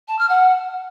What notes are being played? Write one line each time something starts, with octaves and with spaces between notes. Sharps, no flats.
A5
F6
F#5